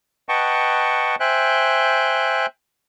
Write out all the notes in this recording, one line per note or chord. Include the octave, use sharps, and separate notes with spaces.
B4 D#5 F#5 G5 A5 C#6
C5 E5 G5 G#5 F#6